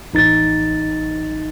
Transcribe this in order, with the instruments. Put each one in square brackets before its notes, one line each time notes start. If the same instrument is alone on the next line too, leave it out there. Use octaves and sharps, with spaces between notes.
[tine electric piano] A1 D#4 A6